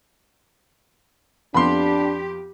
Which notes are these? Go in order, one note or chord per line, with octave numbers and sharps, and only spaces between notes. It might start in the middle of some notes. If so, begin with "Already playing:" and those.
F2 B3 D4 G4 B5 C6